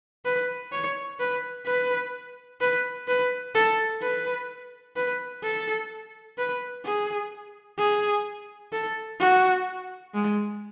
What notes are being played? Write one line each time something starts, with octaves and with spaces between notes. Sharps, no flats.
B4
C#5
B4
B4
B4
B4
A4
B4
B4
A4
B4
G#4
G#4
A4
F#4
G#3